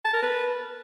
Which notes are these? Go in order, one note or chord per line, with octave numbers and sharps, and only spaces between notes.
A5
A#4
B4